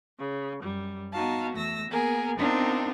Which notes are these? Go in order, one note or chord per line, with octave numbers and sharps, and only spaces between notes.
C#3
F#2 G3
B3 D#4 F#4 F5 A5
E2 A3 E6 A#6
A#3 B3 G#4 A#4
B3 C4 D4 D#4 F4 A#4